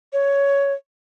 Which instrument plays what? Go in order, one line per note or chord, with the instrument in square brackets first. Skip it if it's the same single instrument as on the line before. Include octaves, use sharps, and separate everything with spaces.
[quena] C#5